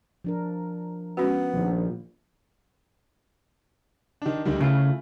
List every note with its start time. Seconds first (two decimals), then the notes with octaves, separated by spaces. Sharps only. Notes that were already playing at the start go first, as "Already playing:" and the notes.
0.24 F3 D4 A#4
1.17 G#3 B3 C#4 F#4
1.53 A#1 D#3 F3
4.22 D#3 D4
4.45 D2 D#3 G3
4.61 C#3 A3 E4 F4